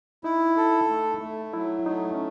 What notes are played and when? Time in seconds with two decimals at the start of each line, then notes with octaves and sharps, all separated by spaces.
0.24 D#4 E4
0.57 A4
0.90 A3
1.22 A3
1.54 F#3 E4
1.86 A3 D#4
2.14 C#4